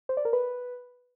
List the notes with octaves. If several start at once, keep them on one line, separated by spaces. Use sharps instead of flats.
C5
D5
A#4
B4